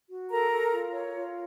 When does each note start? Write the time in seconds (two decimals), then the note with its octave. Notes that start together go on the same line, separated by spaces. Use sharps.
0.11 F#4
0.31 A4 A#4 A#5
0.51 A4
0.72 F4
0.92 C#5
1.13 F4